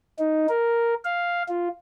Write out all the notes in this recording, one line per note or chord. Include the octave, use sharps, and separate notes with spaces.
D#4
A#4
F5
F4